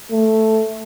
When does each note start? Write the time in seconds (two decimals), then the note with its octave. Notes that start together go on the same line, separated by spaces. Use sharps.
0.12 A3